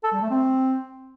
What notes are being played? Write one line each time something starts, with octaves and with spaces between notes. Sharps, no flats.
A4
G3
A3
C4